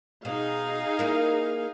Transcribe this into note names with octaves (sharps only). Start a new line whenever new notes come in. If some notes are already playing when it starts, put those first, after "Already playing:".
B2 D#4 G#4 F5
A#3 E4 A#4